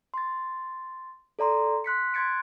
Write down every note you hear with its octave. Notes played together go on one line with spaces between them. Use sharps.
C6 A6
A4 D5 A#5 C6
C6 F#6 B6 C#7
C6 F#6 G#6 A6 C#7 D7